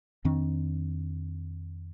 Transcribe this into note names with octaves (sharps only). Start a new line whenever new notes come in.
F2 D#3 C4 D4